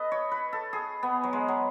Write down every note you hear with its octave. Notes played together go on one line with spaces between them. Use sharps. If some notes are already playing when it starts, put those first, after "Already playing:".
Already playing: A4 B4 D#5
C#5
B4
A4
G#4
B3
F#3
G#3
F#3